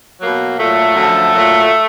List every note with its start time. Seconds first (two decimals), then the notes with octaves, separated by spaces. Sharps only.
0.21 B2 F#3 A#3
0.58 A#2 F#3 A3
0.96 F#2 D3 F3
1.33 A#2 F#3